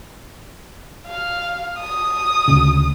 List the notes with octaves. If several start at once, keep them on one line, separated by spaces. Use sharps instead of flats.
F5
D#6
D2 C#3